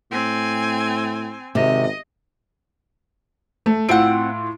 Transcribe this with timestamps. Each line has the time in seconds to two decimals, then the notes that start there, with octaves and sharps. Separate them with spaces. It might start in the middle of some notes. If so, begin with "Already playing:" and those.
0.11 A2 C4 G#5
1.55 G#1 C3 D#5
3.66 A3
3.89 A2 C4 F4 F#5 D7